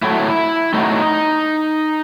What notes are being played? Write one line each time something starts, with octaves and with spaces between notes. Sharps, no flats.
A2 F#3 A3 E4
A2 F#3 A3 D#4